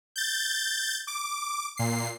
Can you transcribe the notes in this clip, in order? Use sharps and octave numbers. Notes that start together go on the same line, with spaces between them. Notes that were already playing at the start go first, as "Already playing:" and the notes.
G6 A6
D6
A#2 C7